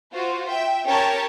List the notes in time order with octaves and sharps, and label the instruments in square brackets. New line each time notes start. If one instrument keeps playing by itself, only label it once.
[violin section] F4 F#4 C5
E5 G5
C#4 G4 A#4 C#5 G5 A5